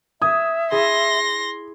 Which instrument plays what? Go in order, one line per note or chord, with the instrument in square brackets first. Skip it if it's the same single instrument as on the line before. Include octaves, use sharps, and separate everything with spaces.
[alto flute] E5 [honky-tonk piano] D#6 [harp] G#6
[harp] E4 G#4 [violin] C6 A#6